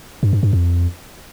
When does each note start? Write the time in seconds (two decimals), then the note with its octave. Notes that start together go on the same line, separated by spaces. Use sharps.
0.23 G2
0.33 G2
0.43 G2
0.53 F2